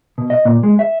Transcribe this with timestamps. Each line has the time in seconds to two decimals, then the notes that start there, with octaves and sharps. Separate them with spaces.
0.18 B2
0.30 D#5
0.45 A#2
0.63 G#3
0.79 E5